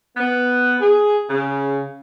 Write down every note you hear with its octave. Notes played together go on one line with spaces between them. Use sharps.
B3
G#4
C#3